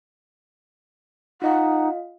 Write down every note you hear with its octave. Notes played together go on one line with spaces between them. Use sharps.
D#4 F4 D#5 F5 F#5